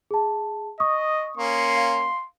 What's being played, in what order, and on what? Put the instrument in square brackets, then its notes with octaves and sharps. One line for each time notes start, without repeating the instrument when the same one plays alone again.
[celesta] G#4 A5
[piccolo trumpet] D#5 [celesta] C#6 D#6
[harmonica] A#3 C#4 [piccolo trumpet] C6
[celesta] F5